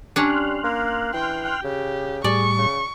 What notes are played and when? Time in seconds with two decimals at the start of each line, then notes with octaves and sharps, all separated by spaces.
0.16 G3 C#4 D4 C6 F6 F#6
0.64 A#3
1.14 E3 G5
1.64 C#3 G4
2.24 A2 G3 G#4 D5 C#6
2.58 C#3